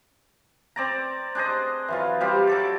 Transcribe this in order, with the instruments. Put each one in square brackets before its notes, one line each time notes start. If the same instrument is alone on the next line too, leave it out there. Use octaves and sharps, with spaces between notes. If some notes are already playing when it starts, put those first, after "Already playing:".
[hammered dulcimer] C4 D5 A#5
D4 G#4 C5 D#5
E3 F#3 F4
G3 C4 F4 G4
F#3 A4 D5